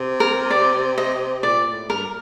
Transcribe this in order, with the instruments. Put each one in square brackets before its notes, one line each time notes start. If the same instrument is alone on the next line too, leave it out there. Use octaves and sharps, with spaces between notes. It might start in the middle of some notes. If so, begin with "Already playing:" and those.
Already playing: [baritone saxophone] C3
[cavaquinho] A#4
D5
D#5
[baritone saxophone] A#2 [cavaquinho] D5
[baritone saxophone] A2
[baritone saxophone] G2 [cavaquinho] A#4